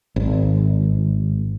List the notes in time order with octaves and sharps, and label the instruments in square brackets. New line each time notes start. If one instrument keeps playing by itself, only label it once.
[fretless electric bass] G#1